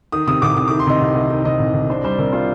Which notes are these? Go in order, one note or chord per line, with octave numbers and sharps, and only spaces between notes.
D#3 D#6
C3 D#6
C2 D6
C2 D#6
D6
D#3
C6
C3 D#5
C2
C2
D#3
C3 D#5
C2
C2
D4 C5
G3 C5
C3 A#4
F4 C5